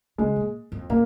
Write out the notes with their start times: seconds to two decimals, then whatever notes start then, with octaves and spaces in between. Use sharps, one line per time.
0.18 C#3 G#3
0.36 A#2
0.72 F2
0.90 A#2 A#3